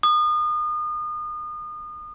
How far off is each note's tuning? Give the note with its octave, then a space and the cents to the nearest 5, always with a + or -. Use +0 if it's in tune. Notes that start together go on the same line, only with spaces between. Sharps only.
D#6 -35